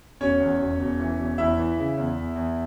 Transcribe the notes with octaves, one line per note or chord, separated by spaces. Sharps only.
E1 C#4 C#5
E2
E1
E1
E3
E1
E2 E4 E5
E3
C#3
E2
E2
E2